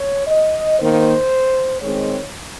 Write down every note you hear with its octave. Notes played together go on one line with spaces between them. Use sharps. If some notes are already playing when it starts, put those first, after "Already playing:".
Already playing: C#5
D#5
D#3 A#3 C5
D#3 G#3 C4 C#5